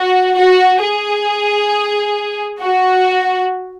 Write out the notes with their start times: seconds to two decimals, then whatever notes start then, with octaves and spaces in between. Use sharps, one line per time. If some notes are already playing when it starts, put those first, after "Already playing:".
Already playing: F#4
0.37 F#4
0.82 G#4
2.61 F#4